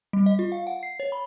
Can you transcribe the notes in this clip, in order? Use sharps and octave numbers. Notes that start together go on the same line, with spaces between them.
G3
D#5
F4
F5
F#5
C7
C#5
B5